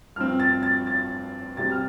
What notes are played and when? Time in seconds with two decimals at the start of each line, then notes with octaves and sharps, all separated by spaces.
0.16 G2 F3 C4 F6
0.40 A6
0.63 A6
0.87 A6
1.57 C3 G3 C4 A6
1.72 F6